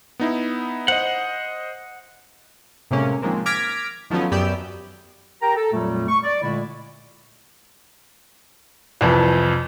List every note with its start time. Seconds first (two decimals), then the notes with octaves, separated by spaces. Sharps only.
0.19 B3 D#4 E4
0.88 C5 D#5 F#5
2.91 A2 C3 G#3 A#3 C#4
3.22 D#3 F3 G#3 A#3 C4
3.46 D6 F6 G#6 A#6 B6 D7
4.10 D#3 F3 F#3 A3 B3 C#4
4.31 F#2 B3 G4 D5 E6 G6
5.42 G4 A#4 G5 A#5
5.57 A4
5.73 F2 A#2 F#3 G3 A3
6.09 C#6
6.24 D5
6.42 A#2 D3 G#3 A3 E4
9.01 C2 F2 E3